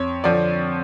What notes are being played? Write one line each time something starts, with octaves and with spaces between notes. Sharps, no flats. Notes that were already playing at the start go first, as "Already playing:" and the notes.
Already playing: F2 C#5
D3 F3 D5